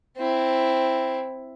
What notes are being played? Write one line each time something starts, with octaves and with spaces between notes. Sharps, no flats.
C4 E4